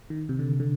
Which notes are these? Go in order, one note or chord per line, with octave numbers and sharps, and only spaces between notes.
D#3
C3
D3
D3